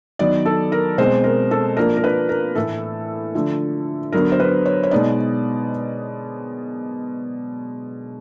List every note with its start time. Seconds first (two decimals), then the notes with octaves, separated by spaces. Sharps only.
0.19 D#3 F#3 B3 D5
0.45 A4
0.72 A#4
0.98 B2 G#3 C4 C5
1.24 A#4
1.51 A4
1.77 F3 A#3 D4 A#4
1.97 A#4
2.04 B4
2.29 A#4
2.55 A2 E3 A3 A4
3.35 D3 F3 A3
4.12 D3 F#3 B3 A#4
4.32 C5
4.40 B4
4.65 C#5
4.83 C#5
4.91 B2 G#3 B3 D#4 D5